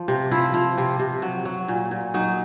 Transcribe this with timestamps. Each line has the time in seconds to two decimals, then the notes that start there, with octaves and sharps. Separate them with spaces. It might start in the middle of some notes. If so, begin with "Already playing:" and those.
Already playing: F3
0.08 C3
0.31 F3 E4
0.54 F3
0.78 C3
0.99 C3
1.22 F#3
1.45 F#3
1.68 A#2
1.91 A#2
2.14 F#3 D#4